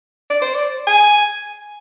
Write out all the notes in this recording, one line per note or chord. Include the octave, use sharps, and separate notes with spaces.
D5
C5
D5
G#5